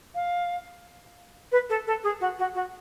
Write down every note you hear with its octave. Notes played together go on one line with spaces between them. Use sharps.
F5
B4
A4
A4
G#4
F#4
F#4
F#4